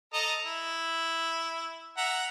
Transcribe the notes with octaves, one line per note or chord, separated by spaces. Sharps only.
A4 D#5 A#5
E4
E5 F#5 A#5